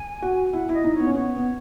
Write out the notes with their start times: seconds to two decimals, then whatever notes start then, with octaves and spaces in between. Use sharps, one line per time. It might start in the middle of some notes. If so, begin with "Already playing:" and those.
Already playing: G#5
0.22 F#4
0.53 E4 F#5
0.69 E4 D#5
0.84 D#4
0.94 C#5
0.99 B3
1.07 C#4
1.14 B3 C#5
1.36 B3